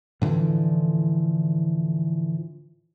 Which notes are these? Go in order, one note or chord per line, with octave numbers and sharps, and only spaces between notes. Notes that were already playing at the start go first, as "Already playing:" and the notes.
A2 D3 E3 F3